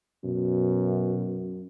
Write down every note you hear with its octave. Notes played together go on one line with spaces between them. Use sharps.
F#2 B2